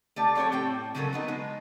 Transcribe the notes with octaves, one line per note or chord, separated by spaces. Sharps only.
A3 G4 D5
F#3 C4 G4 A4 C#5
A2 C4 G5
C#3 F#3 C#4 E4 A4 A#4
F#3 B3 D#4
G#3